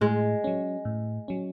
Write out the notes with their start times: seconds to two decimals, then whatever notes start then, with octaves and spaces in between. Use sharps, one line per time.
0.01 A2 G#3
0.44 F#3 C#4
0.85 A2
1.28 F#3 C#4